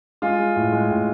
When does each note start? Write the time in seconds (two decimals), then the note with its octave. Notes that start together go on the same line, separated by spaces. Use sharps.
0.22 G#3 F4
0.38 G#3
0.56 A2
0.72 G#3
0.90 A2